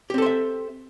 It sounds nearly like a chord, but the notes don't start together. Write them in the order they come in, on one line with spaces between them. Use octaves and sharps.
G4 C4 A4 C5 E5